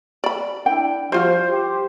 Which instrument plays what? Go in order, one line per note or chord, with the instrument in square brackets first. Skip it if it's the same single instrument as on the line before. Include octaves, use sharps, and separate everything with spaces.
[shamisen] D5 B5
[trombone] D4 [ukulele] E4 G5
[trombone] F3 [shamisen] G3 F4 F#4 [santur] C5
[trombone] G4